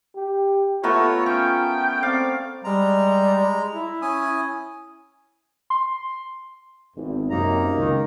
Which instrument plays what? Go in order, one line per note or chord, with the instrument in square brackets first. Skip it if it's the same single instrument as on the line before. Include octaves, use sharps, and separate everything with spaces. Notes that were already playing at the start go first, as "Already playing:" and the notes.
[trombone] G4
[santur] A3 B3 A#4 [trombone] F4 [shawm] C#5
[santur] C#4 [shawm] G5
[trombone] C4 [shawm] D5 [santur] F5
[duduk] G3 [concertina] G#3 A#5
[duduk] E4
[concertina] C#4 G#5 D#6
[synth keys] C6
[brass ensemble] G#1 E2
[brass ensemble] F#2 C3 [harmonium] A#3 D#4 A#5
[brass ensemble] C#2 D#3